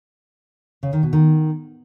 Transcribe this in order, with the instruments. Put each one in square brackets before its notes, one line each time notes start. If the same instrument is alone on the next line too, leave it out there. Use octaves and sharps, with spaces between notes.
[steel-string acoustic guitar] C#3
D#3
B2
D#3